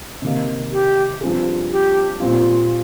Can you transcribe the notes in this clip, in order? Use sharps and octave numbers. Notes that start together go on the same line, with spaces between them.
C3 D#3 A#3
G4
G2 F3 C4 F4 G#4
G4
A#2 G3 C4 F4